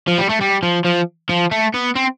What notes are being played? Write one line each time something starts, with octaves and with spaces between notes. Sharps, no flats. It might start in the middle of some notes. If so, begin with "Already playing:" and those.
F3
G3
A3
G3
F3
F3
F3
A3
B3
C4